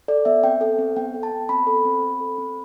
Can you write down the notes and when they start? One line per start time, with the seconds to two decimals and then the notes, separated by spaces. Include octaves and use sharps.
0.08 A4 D5
0.25 B3 E5
0.44 C4 G5
0.61 A4
0.79 C4
0.96 B3 G5
1.14 A4
1.23 A5
1.31 B3
1.49 C4 B5
1.67 A4
1.85 C4
2.03 C4
2.20 A4
2.38 C4